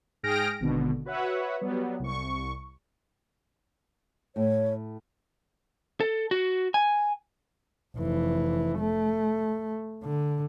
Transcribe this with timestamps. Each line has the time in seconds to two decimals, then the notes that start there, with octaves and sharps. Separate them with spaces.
0.23 G#2 G#4 G5 F6 A#6 D7
0.60 G#1 B2 D3
1.05 F#4 B4 C#5 E5 F#5
1.61 F#3 G3 B3
2.00 C2 C#6
4.36 A2 C#5
6.00 A4
6.31 F#4
6.74 G#5
7.96 F1 E3
8.79 A3
10.03 D3